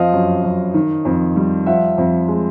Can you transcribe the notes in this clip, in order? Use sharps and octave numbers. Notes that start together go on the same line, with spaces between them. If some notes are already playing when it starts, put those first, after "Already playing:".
Already playing: F2 F3 D#5 F5
F#2
F#2
D#3
F2
G3
F3 E5 F#5
F2
G#3